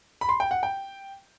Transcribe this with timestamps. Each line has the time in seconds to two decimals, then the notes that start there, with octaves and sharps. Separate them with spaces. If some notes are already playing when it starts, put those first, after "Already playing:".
0.21 B5
0.29 C6
0.40 G5
0.51 F#5
0.63 G5